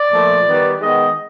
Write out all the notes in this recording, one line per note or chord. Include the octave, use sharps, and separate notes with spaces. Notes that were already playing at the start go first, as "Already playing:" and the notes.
Already playing: D5
A#2 F3 A3
D#3 G3 B3
D#3 G#3 B3 D#5